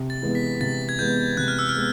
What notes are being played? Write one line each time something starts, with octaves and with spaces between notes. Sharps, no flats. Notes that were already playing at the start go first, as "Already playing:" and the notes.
Already playing: C3
A6
E3 G#3 B3
B6
C3 A6
G#6
E3 G#3 B3 G6
C3 F#6
F6
E6
F6
G#3 B3